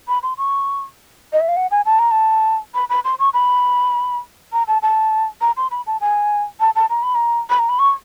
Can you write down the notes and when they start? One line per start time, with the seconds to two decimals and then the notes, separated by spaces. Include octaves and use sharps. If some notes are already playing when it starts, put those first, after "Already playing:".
0.08 B5
0.23 C6
0.38 C#6
1.33 D#5
1.40 E5
1.48 F5
1.56 F#5
1.71 G#5
1.85 A5
1.99 A#5
2.11 A5
2.74 B5
2.89 B5
3.04 C6
3.19 C#6
3.33 B5
4.53 A#5
4.68 A5
4.82 A5
5.41 A#5
5.57 C6
5.71 B5
5.87 A5
6.01 G#5
6.60 A5
6.75 A5
6.90 A#5
7.03 B5
7.15 A#5
7.50 B5
7.59 A#5
7.69 B5
7.79 C#6